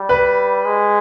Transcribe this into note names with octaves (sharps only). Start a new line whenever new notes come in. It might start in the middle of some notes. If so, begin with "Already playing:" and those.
Already playing: G3
B4
G#3